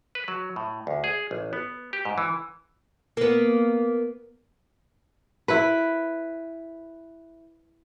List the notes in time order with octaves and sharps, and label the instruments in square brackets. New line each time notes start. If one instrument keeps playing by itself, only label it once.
[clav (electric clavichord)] B4
F#3
A2
D2
G#4
A1
B3
G4
G#2
E3
[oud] A#3 B3
[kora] E4 B4